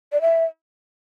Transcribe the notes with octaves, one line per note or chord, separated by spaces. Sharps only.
D5
E5